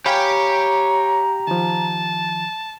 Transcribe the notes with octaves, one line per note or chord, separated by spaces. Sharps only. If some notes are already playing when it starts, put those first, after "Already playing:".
G4 C#5 F5 G5 G#5 A#5 B5
D#3 F3 A5